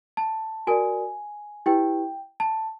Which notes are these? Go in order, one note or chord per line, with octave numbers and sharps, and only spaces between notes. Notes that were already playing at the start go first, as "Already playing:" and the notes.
A5
F#4 A#4 D5 G#5
E4 G4 B4 G5
A5